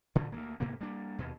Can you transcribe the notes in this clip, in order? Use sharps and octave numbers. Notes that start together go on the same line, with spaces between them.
G2 A#2 D3
D2 F#3 A#3
G#2 C3 A#3 B3
G3 A#3 D4
D#2 B2